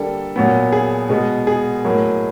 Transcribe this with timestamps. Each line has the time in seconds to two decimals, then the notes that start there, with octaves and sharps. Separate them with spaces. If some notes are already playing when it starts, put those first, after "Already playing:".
Already playing: D3 G3 A#3 A4
0.36 A#2 F#3 B3
0.72 G#4
1.10 B2 G#3 B3
1.47 G#4
1.85 A2 F#3 A#3